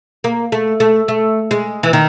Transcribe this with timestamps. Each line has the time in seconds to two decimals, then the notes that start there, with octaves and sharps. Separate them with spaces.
0.24 A#3
0.52 A3
0.80 A3
1.08 A3
1.51 G#3
1.83 E3
1.93 D#3